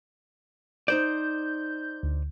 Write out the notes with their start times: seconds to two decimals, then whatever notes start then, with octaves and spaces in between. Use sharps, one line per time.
0.88 D#4 C5 D5 G6
2.03 D2